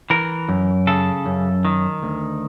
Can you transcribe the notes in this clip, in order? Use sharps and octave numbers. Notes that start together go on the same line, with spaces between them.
E3 A#4
F#2
C#3 A4
F#2
D#3
D2